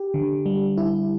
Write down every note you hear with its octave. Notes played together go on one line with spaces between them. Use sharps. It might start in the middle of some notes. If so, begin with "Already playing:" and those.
Already playing: G4
D3
G3
E4